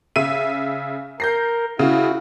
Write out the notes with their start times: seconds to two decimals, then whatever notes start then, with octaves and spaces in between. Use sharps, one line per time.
0.16 C#3 E5 D#7
1.20 A#4 G6 A#6 C7
1.79 C#3 E4 F#4